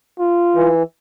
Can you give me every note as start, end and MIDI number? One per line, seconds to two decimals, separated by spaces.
0.20 0.72 65
0.56 0.83 52